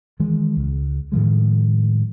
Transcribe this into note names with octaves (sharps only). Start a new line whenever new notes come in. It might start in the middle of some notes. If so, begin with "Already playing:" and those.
D#3 E3 G#3
C#2
A2 D#3 F3 G#3